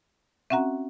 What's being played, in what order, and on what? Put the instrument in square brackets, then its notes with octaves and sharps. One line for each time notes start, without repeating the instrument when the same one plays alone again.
[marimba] C4 C#4 F#4 [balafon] E5 F#5 A#5